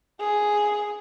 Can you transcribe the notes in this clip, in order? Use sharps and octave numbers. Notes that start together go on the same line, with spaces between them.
G#4